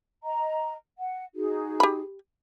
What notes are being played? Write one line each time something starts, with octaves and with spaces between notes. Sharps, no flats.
D#5 A#5
F#5
D#4 F#4 G#4
G4 B5